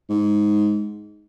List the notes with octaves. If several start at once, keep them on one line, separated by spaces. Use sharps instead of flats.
G#2